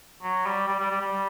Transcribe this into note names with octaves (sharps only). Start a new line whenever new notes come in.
F#3
G3
G3
G3
G3
G3